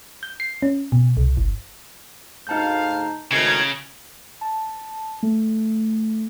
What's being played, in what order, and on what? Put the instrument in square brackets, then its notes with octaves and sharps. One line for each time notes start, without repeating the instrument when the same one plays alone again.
[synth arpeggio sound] G6
C7
C#4
B2
C2
G1
[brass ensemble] D2 G#2 F5 [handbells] D#4 A5 G6
[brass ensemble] G#1 A2 D#4 [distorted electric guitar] C#3 [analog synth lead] G#6 [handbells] A#6
[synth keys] A5
A3